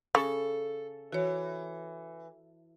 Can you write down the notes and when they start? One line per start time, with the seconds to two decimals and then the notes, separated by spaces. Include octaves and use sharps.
0.15 C#3 A4
1.12 E3 F#4 C#5